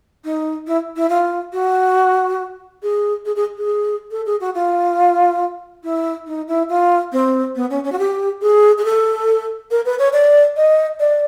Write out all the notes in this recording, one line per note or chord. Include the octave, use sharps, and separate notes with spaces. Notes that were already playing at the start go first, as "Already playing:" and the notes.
D#4
E4
E4
F4
F#4
G#4
G#4
G#4
G#4
A4
G#4
F#4
F4
E4
D#4
E4
F4
C4
B3
C#4
C#4
F#4
G4
G#4
G#4
A4
A#4
B4
C#5
D5
D#5
D5